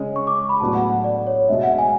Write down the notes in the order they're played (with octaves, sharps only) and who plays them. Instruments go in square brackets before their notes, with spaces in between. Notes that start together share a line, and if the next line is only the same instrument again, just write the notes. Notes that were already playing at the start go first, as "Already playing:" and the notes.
Already playing: [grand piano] C#3 G#3 C#4
[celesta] C#6
D6
C#6
B5
[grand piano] A2 F#3 B3 D4 [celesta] A5
[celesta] F#5
F#5
D5
C#5
[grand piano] B2 G#3 D4 [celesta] E5
[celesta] E5
F#5
G#5